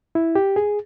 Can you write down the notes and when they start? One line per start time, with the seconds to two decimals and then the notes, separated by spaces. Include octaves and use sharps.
0.15 E4
0.35 G4
0.56 G#4